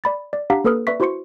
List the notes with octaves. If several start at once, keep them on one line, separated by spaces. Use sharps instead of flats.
D5 B5 A6
D5
D4 G4 F5 F#5 A#5 B6
A#3 A4 B4 D#6 F6
B4 D5 E5 C#6 B6
E4 F#4 C5 C6 C#6 C#7